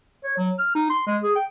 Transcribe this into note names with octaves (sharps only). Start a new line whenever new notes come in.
C#5
F#3
F6
D#4
C6
G#3
G#4
G5